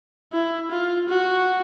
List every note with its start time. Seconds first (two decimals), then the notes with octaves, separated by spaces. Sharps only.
0.33 E4
0.71 F4
1.09 F#4